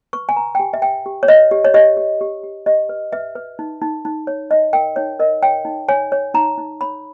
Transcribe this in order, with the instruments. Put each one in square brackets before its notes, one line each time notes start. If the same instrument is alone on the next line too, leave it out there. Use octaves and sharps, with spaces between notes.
[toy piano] B4 C#6
G#5
B4 A#5
G5
G4 G#5
E5
B4 G5
G4
C#5
B4 D#5
G4
C#5
G4 D#5
G4
G4
G4
G4 D#5
B4
B4 E5
B4
D#4
D#4
D#4
C#5
D#4 D#5
A#4 G5
D#4 C#5
A#4 D#5
C#5 G5
D#4
C#5 G#5
C#5
D#4 A#5
D#4
C#5 B5